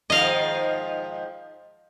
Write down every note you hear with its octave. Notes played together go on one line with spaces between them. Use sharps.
G#2 D#3 F3 D#5 F5